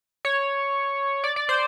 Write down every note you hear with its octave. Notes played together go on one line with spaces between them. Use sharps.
C#5
D5
D5
C5